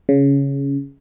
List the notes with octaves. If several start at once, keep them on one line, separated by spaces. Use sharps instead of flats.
C#3